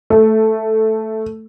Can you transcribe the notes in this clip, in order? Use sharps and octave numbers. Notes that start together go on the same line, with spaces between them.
A3